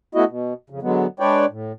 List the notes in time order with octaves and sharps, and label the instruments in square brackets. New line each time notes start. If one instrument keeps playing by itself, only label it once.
[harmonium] A3 B3 E4 F#4 D#5
B2
F2 C#3
D3 F#3 G#3 B3
G#3 D4 B4 C#5 D5 G5
A2